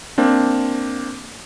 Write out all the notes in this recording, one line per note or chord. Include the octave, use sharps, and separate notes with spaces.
A#3 C4 D4